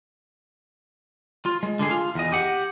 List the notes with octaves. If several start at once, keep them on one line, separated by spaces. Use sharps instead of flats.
F4
G#3
D3 G#4
F4
E2 D#5
G4 F#5